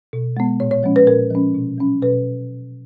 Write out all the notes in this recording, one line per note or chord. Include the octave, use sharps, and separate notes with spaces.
B2
G#3 B3
A#2 C#5
C#5
F3 G#3 C#4
B4
A#2 A#4
F3 G#3 C#4
B2
F#3 C#4
B2 B4